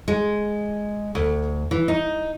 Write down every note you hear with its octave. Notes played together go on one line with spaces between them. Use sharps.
G#3
D2
E3
D#4